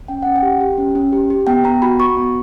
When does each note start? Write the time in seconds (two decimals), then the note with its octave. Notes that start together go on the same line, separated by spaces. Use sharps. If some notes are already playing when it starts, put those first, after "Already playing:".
0.08 C#4 G5
0.22 C#4 F#5
0.36 G5
0.43 G4
0.60 G4
0.78 C#4
0.95 C#4
1.13 G4
1.30 G4
1.47 B3 G5
1.64 B3 A#5
1.82 F#4 B5
1.99 F#4 C#6
2.17 B3